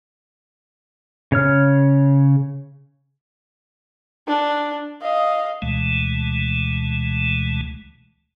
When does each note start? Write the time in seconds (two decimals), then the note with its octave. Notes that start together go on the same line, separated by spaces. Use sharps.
1.32 C#3 C#5 F6
4.28 D4
5.02 D#5 F5
5.62 D2 B2 E3 G#3 A3